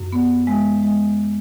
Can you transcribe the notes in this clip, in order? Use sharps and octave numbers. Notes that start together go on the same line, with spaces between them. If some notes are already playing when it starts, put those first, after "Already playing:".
Already playing: F#2
B3
G#3
G#3